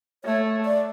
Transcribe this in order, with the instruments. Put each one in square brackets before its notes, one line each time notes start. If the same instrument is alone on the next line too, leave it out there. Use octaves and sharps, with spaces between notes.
[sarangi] A3 [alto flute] C#5
[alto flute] D5